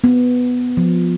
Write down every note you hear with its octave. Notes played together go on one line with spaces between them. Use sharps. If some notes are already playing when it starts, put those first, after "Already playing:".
B3
F3